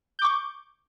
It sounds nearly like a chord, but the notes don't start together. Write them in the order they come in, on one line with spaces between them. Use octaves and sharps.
G6 D6 C#6